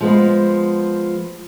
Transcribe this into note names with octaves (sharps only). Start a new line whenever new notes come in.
F3 G#3 B3